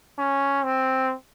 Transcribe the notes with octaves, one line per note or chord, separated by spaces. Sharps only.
C#4
C4